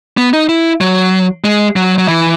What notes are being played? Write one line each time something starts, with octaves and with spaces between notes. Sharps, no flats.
B3
D#4
E4
F#3
G#3
F#3
F#3
E3